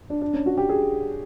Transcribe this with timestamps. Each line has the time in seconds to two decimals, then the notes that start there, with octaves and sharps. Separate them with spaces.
0.10 D4
0.21 D4
0.33 C#4
0.46 F#4
0.58 G4
0.69 G#4